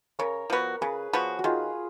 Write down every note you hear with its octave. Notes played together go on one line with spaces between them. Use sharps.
C#3 A#4 C#5
F3 B3 F#4
C#3 G#4 B4
F3 B3 F#4
F#4
D#3 F4 G#4